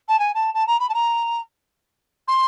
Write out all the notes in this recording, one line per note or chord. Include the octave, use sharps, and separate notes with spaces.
A5
G#5
A5
A5
A#5
B5
A5
A#5
C6